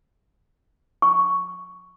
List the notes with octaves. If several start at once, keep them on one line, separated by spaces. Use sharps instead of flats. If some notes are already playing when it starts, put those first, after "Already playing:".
C#6